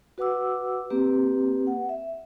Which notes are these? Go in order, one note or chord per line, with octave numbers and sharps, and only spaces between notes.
F#4 B4 F#5 D6 E6
A#3 C4 G4 B4
F#5
E5